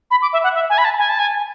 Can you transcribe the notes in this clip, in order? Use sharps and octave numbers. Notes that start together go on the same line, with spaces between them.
B5
D6
E5
F#5
E5
G#5
B5
A5
G#5
A5
G#5